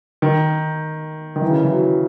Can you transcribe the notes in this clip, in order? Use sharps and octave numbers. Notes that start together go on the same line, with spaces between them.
D#3
D#3
E3
C#3
D#3
E3
F#3